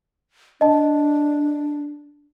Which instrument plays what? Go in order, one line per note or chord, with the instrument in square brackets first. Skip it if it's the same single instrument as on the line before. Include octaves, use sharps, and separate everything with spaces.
[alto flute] D4 [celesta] D#5 A5